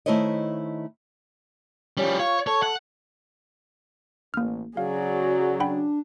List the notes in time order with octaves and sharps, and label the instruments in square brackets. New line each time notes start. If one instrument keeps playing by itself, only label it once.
[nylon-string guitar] D#3 A3 E4 C5 C#5 D#5
[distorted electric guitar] F3 G3 [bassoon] C#4
[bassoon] F4 [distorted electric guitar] C#5
[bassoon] A4 [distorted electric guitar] C#5
[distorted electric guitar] F#5
[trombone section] A1 [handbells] A#3 F6
[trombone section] C#3 F#3 [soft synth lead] F#4 [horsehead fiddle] G#4 D5 [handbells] F5
[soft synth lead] D4 [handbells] F#5 G5 B5